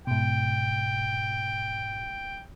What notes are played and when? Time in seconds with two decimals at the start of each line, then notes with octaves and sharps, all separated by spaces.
0.07 G#2 B2 G5